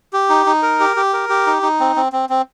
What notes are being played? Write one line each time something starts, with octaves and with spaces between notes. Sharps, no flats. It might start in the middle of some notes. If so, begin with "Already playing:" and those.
G4
D#4
D#4
A#4
G4
G4
A#4
G4
D#4
D#4
C4
C4
C4
C4